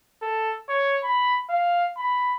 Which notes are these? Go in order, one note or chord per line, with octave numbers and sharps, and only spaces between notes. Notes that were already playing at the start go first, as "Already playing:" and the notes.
A4
C#5
B5
F5
B5